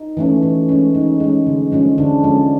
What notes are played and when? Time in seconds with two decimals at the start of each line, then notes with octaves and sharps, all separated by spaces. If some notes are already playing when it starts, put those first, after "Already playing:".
Already playing: D#4
0.17 E3 A3 C#4
0.43 E3
0.69 G#3 C#4
0.94 E3 D#4
1.20 G#3 C#4
1.47 D3
1.72 F3 G#3 C#4
1.98 D3 D4
2.24 F3 G#3 C#4